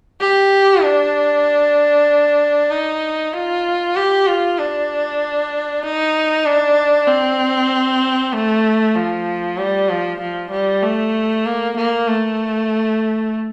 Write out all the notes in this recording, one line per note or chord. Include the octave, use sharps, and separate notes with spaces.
G4
D4
D#4
F4
G4
F4
D4
D#4
D4
C4
A3
F3
G3
F3
F3
G3
A3
A#3
A#3
A3